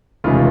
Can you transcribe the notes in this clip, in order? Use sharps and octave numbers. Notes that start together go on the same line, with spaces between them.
F1 D#2 C#3 E3 G#3 F4